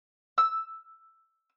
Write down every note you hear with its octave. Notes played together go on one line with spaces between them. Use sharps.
E6